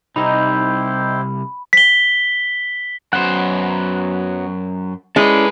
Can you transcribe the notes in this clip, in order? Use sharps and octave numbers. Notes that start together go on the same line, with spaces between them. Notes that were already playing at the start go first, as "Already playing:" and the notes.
C2 C3 D#4 E4 G4 C5 B5
B6 G7
F#2 F#3 B3 C5 F#5
G#3 C#4 E4 A4 B4 D5